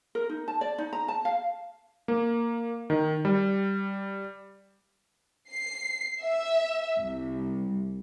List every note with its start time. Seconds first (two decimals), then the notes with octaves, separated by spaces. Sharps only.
0.15 A#4
0.30 D#4
0.48 A5
0.61 D5
0.78 D#4
0.93 A#5
1.08 A5
1.25 F5
2.08 A#3
2.90 D#3
3.25 G3
5.51 C7
6.22 E5
7.00 C2